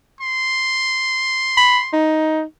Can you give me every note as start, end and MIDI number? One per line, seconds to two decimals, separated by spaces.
0.21 1.94 84
1.57 1.79 83
1.93 2.42 63